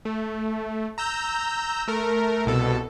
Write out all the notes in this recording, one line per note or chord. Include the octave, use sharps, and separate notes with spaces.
A3
A#5 E6 G6
A3 A#4
C2 B2 A4